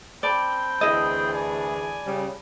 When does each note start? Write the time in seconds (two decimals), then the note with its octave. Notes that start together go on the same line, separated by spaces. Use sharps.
0.23 C4 D5 G5 A5 B5 G7
0.81 D2 E3 E4 G#4 D#5
1.33 D5 G#5
2.06 C#3 G3